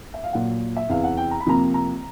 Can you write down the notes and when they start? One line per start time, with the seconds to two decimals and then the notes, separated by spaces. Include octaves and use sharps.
0.14 E5
0.24 F5
0.33 A#2 F#3 A#3 F#5
0.77 E5
0.89 E2 C3 E3 F5
1.04 F#5
1.17 G5
1.31 A#5
1.40 B5
1.46 F2 C3 F3 A#3 A#5
1.74 A#5